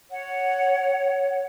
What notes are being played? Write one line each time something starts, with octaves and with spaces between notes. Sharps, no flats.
C#5 F#5